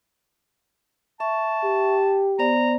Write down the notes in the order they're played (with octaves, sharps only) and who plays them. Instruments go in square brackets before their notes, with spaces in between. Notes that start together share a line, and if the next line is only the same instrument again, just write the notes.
[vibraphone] E5 C#6 [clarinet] A5
[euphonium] G4
[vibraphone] B3 C5 D5 [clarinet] A#5